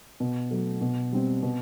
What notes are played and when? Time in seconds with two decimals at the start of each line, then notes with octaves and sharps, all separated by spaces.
0.20 B2
0.51 F#3 A3
0.81 B2
1.12 G3 C4
1.43 B2